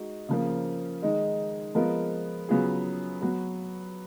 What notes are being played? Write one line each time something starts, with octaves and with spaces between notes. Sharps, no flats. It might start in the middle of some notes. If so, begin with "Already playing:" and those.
Already playing: G#3 D#4 F#4
C#3 F3 A#3
D#3 G#3 D#4
F3 G#3 B3 F4 A#4
C#3 F#3 B3 F4 G#4
F#3 B3 F#4